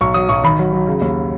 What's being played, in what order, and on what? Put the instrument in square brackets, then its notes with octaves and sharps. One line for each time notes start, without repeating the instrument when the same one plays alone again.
[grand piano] B1 C#6
F#3 D#6
B1 C#6
D#3 B5
F#3
F#3
C#3
D#2